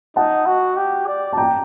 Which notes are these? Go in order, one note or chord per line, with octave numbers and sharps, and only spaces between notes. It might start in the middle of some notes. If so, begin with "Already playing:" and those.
D#4 F#5 A5
F#4
G4
D5
A5
G5 A#5